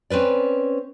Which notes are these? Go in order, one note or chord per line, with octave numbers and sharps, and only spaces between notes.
C4 C#4 B4 D5